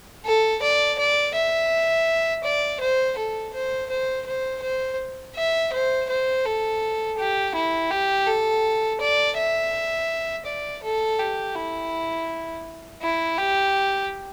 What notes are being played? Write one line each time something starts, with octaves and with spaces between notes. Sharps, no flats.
A4
D5
D5
E5
D5
C5
A4
C5
C5
C5
C5
E5
C5
C5
A4
G4
E4
G4
A4
D5
E5
D5
A4
G4
E4
E4
G4